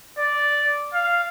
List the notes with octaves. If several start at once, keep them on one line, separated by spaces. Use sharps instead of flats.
D5
F5